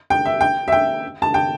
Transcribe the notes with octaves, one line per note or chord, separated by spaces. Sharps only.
G5
E5
G5
E5
G5
A5
G5